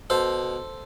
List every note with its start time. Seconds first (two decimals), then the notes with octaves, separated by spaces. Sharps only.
0.10 B2 A4 C5